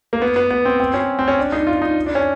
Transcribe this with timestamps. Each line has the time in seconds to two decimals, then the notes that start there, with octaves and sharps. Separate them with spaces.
0.13 A#3
0.22 B3
0.36 B3
0.50 B3
0.65 C4
0.80 C4
0.94 C#4
1.19 C4
1.28 C#4
1.38 D4
1.52 D#4
1.67 F4
1.82 D#4
2.06 D4
2.15 C#4